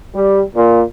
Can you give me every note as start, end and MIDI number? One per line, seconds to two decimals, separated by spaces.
0.15 0.43 55
0.55 0.83 46